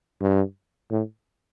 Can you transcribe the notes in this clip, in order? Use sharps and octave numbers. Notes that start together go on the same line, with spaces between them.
G2
A2